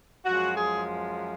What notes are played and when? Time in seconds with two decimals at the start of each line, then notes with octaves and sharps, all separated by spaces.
0.24 F#2 F3 G#3 F#4
0.56 G#4